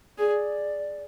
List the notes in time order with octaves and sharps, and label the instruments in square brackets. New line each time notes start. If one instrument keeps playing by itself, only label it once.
[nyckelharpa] G#4 [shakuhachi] D5